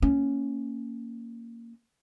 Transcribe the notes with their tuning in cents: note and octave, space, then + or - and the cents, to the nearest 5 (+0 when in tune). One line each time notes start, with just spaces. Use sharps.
A#3 -10 C#4 +0